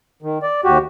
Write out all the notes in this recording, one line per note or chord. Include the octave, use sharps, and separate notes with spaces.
D#3
D5
D#2 F#4 G4